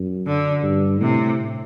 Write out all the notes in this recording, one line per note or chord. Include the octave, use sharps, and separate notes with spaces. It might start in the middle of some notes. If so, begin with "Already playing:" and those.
Already playing: F#2
D3
G2
A2 C3